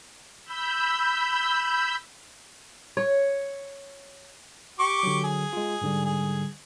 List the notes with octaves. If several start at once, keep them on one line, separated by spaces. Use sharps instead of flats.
B5 E6 G6
C#5
G4 C#6 D6
D3 F#3
G#4
G#3 F4
G#2 D3 G3
G#4